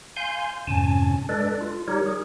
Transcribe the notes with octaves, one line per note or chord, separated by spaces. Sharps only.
F5 G#5 C6 G6
F2 G#2 C3 C#4 G#5 A5
G#3 D4 A4 B4 D5
F4
G3 D#4 G4 A#4 C#5
G#4